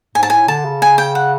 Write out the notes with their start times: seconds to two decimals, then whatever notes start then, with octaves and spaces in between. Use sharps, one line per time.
0.15 G#2 G#5
0.23 A5
0.30 A2 G#5
0.48 D3 A5
0.65 C#3
0.82 G#5
0.98 G5
1.15 F#5